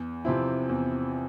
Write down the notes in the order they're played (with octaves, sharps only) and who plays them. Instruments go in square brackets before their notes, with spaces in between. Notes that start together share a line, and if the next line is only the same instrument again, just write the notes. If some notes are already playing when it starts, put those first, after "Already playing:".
Already playing: [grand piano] E2
C3 F3 C4 E4
E2